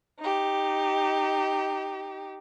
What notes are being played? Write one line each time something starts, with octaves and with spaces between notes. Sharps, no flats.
D#4 G4